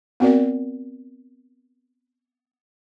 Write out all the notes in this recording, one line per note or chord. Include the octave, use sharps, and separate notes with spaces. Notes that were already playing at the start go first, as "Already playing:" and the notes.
B3 C4 F#4 A#4 D5